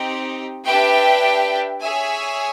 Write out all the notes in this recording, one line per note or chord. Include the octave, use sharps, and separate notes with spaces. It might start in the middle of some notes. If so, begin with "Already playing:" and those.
Already playing: C4 D#4 G4
D4 G4 B4 E5 G5
G#4 C#5 E5 G#5